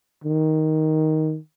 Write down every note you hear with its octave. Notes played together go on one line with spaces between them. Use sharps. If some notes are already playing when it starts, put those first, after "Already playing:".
D#3